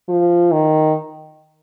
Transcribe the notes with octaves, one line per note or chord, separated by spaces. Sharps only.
F3
D#3